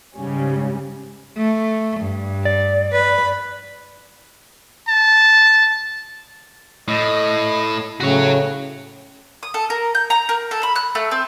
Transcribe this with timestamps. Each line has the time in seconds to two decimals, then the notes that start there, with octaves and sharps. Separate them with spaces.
0.15 G#2 C#3 G3 C#4
1.37 A3
2.01 G2
2.45 D5
2.93 B4
4.88 A5
6.88 A2 D#5
8.00 A2 C#3 F#4 C#5
9.43 D#6
9.54 A4
9.70 A#4
9.95 G6
10.10 A#5
10.29 A#4
10.51 A4
10.63 B5
10.76 F#6
10.95 A3
11.11 C4